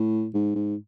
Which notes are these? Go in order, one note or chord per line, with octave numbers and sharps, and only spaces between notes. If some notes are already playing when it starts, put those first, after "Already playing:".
Already playing: A2
G#2
G#2